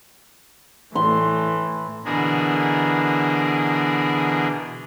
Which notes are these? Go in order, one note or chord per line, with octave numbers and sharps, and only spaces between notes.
A2 E3 C6
B2 D3 E3 D4 G#4 A#4